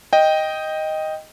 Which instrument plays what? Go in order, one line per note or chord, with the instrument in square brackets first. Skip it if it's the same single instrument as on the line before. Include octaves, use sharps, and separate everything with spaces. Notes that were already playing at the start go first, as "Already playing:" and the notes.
[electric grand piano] D#5 G5